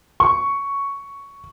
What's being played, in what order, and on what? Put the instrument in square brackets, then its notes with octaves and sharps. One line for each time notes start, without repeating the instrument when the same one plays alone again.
[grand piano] C#6